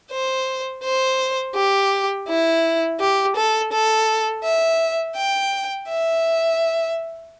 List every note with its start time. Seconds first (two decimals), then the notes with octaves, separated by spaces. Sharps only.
0.11 C5
0.84 C5
1.56 G4
2.28 E4
3.00 G4
3.36 A4
3.72 A4
4.44 E5
5.16 G5
5.89 E5